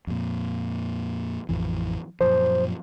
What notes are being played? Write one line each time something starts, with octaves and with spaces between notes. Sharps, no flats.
F2 A#2
A1 F2 E3
F#2 A#2 F3 C5